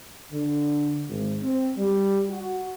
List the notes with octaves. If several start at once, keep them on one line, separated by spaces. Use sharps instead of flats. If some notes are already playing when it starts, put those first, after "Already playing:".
D3
G#1
C4
G3
F#4